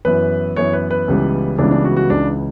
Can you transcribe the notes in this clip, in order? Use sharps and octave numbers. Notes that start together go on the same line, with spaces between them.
F#2 E3 B3 B4
F#2 E3 B3 C#5
B4
B4
C#2 C#3 E3 G3 B3
C#2 C#3 E3 G3 B3 D4
D4
F#4
F#4
C#2 C#3 E3 D4